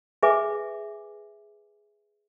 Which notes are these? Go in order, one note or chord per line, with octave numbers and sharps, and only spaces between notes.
G#4 B4 E5 G#5 D6